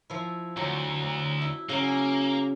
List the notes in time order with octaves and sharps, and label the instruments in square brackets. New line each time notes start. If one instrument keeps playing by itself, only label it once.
[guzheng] F3 E4
[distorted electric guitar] D2 [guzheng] F#3
[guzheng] E4
[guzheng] C#3 F#3 [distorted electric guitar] A#3